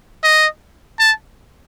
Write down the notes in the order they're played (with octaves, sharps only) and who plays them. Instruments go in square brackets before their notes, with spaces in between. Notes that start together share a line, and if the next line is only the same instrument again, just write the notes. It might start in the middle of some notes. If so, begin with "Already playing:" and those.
[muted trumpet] D#5
A5